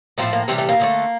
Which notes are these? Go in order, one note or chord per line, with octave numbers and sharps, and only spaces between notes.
A2 F3 A3 A#3
A#3
C3 E3 G3 C4
A3
A#3
D3 F3 A3